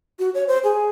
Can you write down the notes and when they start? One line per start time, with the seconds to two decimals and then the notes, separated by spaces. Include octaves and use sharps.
0.19 F#4
0.34 C#5
0.48 C5
0.64 G#4